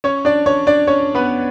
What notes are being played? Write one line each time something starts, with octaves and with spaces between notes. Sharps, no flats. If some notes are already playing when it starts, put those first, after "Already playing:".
C#4 C#5
D4 D5
C#4 C#5
D4 D5
C#4 C#5
B3 B4